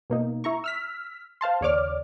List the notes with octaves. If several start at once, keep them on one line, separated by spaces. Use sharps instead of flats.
B2 A#3 D#4
E4 A#5 C#6
E6 F6 B6
C5 F5 A5 C6
D#2 C#3 C#5 D5 D6 F6